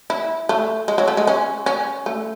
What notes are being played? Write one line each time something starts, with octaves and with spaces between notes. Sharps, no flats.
E4
A3
G#3
F#3
A3
G#3
C#4
C#4
A3